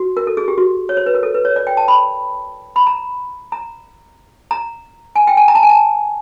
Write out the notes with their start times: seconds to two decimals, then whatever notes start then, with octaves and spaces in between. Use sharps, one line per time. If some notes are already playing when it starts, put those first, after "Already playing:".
Already playing: F#4
0.17 A#4
0.27 A4
0.37 G#4
0.48 G4
0.58 F#4
0.89 C#5
0.97 C5
1.06 B4
1.14 A#4
1.23 A4
1.34 B4
1.45 C#5
1.56 D5
1.67 G5
1.77 A5
1.88 B5
2.76 B5
2.87 A#5
3.52 A#5
4.51 A#5
5.16 G#5
5.27 G5
5.37 G#5
5.48 A#5
5.55 A5
5.63 G#5
5.70 A5